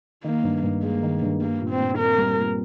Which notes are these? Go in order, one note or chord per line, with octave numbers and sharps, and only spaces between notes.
D#3 A#3
G2
G2
G#3 A#3
D#3
G2
G3 A#3
A#2
C4
A#2
C4 A#4
G3
A#2